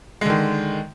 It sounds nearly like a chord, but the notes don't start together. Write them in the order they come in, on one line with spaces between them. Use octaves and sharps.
G#3 D3 D#3